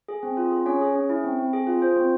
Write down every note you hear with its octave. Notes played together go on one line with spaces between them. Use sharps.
G#4
C4
F4
G#4
C#4 C#5
G#4
C#4
E4
C4
C4
G#4
F4
F4 C5
C4